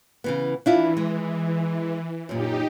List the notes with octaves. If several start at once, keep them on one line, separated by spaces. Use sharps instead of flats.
C#3 E3 B3
E3 D4 E4 F4
G#3
F#2 A#2 D#4 G4